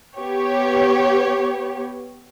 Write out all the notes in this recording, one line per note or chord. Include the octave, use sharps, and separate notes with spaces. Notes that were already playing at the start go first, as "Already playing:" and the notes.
B3 G4 C#5